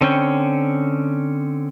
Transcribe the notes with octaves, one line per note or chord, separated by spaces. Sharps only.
D3 C4 C#4 G5